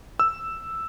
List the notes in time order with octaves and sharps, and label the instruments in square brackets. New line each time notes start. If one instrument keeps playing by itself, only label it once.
[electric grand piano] E6